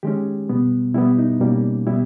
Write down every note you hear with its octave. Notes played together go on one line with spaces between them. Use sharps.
D#3 G#3 C#4 G4
B2 G3 B3
B2 G3 B3 E4
D#4
B2 G3 A#3 C#4
B2 G3 B3 E4